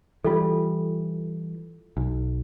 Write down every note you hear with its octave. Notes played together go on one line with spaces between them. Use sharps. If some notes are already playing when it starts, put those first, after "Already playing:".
E3 G3 F4 A4
B1